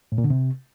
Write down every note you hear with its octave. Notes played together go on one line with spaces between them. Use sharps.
A2
A#2
D3
C3